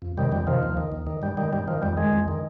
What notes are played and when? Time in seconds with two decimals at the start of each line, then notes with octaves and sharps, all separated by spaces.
0.02 F2
0.18 C3 D#3 G3
0.32 F2 G3
0.47 C3 D#3 F3
0.63 D#2
0.77 D#3
0.92 D#2
1.07 D#3
1.22 G2 G3
1.37 D#3 G3
1.53 G2 G3
1.68 D#3 F3
1.82 F2 G3
1.97 D#3 G#3
2.13 F2
2.28 D#3